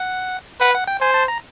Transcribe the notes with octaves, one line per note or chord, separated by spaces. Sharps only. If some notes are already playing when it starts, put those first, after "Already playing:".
Already playing: F#5
B4 F#5
F#5
G5
C5 G#5
A5
A#5